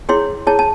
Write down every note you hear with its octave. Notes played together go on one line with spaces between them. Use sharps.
E4 G#4 C#5 C6
E4 G#4 C#5 A5
A5